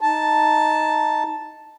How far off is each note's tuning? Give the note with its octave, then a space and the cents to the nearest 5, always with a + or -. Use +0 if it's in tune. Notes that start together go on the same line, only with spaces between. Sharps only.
D#4 +0 A5 +0